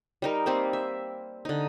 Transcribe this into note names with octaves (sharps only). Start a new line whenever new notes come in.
G3 D#4 A#4
G3 A#3 C4 C5
E5
D3 D#4